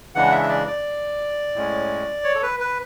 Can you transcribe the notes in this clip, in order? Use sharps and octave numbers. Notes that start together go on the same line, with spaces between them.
C#3 E3 G#3 D4 F#5
E5
E5
D5
D5
A2 G#3 C#4
C#5
A4
B4
B4